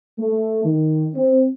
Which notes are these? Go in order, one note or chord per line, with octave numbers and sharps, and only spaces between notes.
A3
D#3
C4